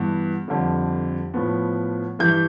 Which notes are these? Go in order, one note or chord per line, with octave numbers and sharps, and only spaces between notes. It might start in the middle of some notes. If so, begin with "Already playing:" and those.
Already playing: G2 E3 B3
F2 D3 G3
A2 F3 B3
G2 E3 G3 G6